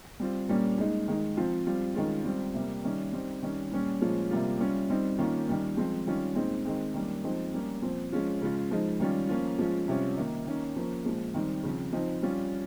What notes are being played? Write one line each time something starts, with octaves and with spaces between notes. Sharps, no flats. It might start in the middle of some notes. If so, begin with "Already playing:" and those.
G3 C4 F4
A#2 G3 A#3 C#4
A#2 G#3 D#4
D#3 G#3 D#4
F3 C4 F4
G3 C4 F4
D#3 G#3 C#4 F4
G3 C4 F4
C3 G3 A#3
D#3 G3 C#4
G3 C4 D#4
D#3 G3 C#4
A#2 G3 C#4
A#2 F3 G#3 C#4 F4
C3 G3 A#3 F4
G3 C#4 F4
G3 C4 D#4
D#3 A#3 C#4 F4
D#3 G3 C#4
F3 G#3 C4
D#3 G3 C#4 F4
A#2 G#3 C4 D#4
D#3 G#3 C4
D#3 G3 A#3 C#4
F3 G#3 C4 D#4
G3 A#3 C#4
A#2 F3 C4
F3 G#3 C#4 F4
C#3 G#3 C#4 F4
F3 G#3 D#4
D#3 G3 C#4 F4
F3 A#3 C#4 F4
F3 G#3 C#4 F4
C3 G3 C#4 F4
D#3 A#3 D#4
D#3 A#3 C#4
F3 A#3 C#4
A#2 F3 G#3
D#3 G3 C4 D#4
C#3 F3 C4
F3 C4 D#4
G3 C#4 F4